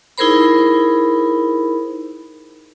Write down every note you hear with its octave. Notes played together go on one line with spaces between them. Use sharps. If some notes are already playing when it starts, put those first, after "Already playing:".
D#4 E4 G#4 A#4 C5 B5